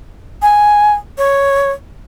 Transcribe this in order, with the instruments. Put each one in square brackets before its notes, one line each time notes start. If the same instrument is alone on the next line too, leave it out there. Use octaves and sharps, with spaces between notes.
[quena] G#5
C#5